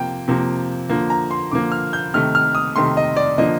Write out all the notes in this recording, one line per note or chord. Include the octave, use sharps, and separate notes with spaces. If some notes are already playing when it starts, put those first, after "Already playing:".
Already playing: C3 F3 A#3 G5
C3 F3 A#3
D3 F3 A#3
A#5
C6
D3 F3 A#3 D6
F6
G6
C3 D#3 A3 F6
F6
D#6
C3 D#3 A3 C6
D#5
D5
D3 F3 A#3 D#5